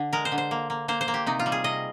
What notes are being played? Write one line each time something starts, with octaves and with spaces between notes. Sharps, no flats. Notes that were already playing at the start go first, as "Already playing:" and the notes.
Already playing: D3
G#3 A#4
C5
D3
C5
A#3
A#3
A#3 C5
C5
A#3
G4
C3 D#4
F4
G3
G#4
C3 D#5